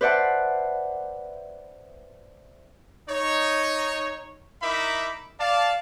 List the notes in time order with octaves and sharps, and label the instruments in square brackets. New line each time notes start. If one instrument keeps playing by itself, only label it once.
[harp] B4 C5 D5 E5 F#5 A5
[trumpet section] D#4 C#5
D#4 E4 A#4 E5 B5 D6
D5 F5 A5